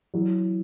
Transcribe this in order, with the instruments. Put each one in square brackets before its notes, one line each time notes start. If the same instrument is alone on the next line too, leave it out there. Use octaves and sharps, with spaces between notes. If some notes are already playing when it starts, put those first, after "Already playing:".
[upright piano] E3 F#3